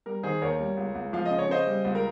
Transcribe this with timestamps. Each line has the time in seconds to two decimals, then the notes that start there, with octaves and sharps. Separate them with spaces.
0.06 G3 A#4
0.23 D#3 G#4 C5
0.41 D#2 A#4 C#5
0.60 G3
0.77 C#2
0.95 C#2
1.13 F3 F5
1.25 D#5
1.30 C#3
1.39 C#5
1.49 C#3 C5 D#5
1.67 G3
1.85 C#2
1.95 A#4